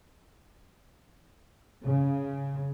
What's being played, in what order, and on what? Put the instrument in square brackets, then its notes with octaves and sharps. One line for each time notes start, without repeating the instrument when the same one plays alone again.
[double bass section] C#3